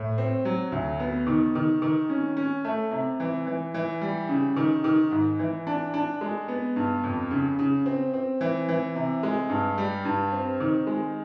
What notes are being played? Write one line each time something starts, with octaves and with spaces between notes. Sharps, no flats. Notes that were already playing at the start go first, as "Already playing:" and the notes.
Already playing: A2
C4
F#3
D2
B3
D#3
D#3
D#3
C#4
C#4
A3
C3
E3
E3
E3
G3
C#3
D#3
D#3
G#2
E3
D4
D4
G#3
B3
G2
F2
C#3
C#3
C4
C4
E3
E3
C3
G#3
G2
G3
G2
C4
D#3
G#3